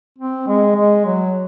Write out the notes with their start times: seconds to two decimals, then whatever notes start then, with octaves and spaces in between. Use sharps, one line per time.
0.19 C4
0.47 G#3
0.76 G#3
1.06 F#3